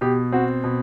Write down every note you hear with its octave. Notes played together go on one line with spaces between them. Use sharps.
B2 G4
C4 F#4
B2